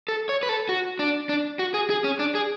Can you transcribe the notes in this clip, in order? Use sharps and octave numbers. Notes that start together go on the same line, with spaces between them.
A4
C#5
B4
A4
F#4
D4
D4
F#4
G#4
G#4
C#4
D4
G#4